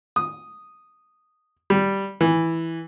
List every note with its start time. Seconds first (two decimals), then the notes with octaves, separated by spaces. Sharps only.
0.16 D#6
1.70 G3
2.21 E3